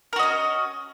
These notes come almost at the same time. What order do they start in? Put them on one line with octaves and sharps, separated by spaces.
A#4 F#4 D#5 C#4